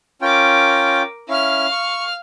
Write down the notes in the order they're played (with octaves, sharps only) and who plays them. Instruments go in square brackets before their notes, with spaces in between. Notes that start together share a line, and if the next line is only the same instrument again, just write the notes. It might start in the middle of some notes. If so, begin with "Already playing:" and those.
[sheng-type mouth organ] C#4 F4 G5 [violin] A#4 D6
[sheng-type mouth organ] C#4 E4 [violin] F5 F6
[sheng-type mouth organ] C#6